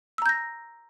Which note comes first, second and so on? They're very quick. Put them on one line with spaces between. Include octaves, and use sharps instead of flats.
E6 A#5 G6 A#6